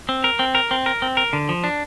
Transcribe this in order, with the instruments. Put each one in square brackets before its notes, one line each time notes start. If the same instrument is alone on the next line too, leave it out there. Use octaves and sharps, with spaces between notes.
[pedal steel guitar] C4
A#4
C4
A#4
C4
A#4
C4
A#4
D3
F3
D4